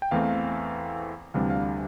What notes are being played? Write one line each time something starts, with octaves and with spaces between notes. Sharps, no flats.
G5
E2 E3 A3 C4 F5
D2 C3 E3 G3 D4 F5
F5